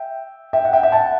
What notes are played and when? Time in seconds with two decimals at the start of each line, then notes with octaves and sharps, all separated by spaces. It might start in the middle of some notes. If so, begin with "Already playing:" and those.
Already playing: E5 G5
0.53 E5 G5
0.65 F#5
0.73 E5 G5
0.83 E5 G5
0.92 F#5 A5